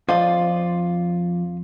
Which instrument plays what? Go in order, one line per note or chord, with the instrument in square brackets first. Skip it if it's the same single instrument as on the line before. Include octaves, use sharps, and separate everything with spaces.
[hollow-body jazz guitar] F2 C5 D#5 [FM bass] F3 [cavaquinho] F4 D5